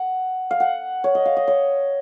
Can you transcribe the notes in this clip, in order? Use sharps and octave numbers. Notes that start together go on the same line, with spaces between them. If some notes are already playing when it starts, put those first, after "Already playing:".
Already playing: F#5
F5
F#5
C#5
D#5
F5
D#5
C#5